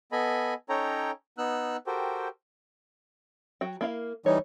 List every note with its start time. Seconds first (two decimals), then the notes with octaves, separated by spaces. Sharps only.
0.12 B3 A4 D#5 G#5 B5
0.69 C#4 D#4 A4 C#5 G5 A#5
1.38 B3 D#4 E6 F#6
1.87 F#4 G4 A4 A#4 C5 G5
3.61 F#3 F#4 G5
3.81 A#3 E4 F5
4.26 E3 G3 D#4 C#5